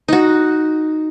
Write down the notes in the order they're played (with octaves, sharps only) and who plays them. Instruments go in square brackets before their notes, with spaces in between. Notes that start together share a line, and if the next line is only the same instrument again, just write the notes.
[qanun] D#4 F#4